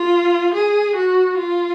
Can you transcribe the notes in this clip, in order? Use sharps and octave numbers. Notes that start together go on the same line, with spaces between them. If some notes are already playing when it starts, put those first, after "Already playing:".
Already playing: F4
G#4
F#4
F4